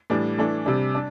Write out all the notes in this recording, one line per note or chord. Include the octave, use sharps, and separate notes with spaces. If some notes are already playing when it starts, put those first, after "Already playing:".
A2 E3 G3 D4
E3 A3 D4
C3 G3 D4
D4